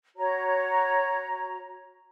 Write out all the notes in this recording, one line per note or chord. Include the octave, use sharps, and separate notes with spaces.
F#4 C#5 A#5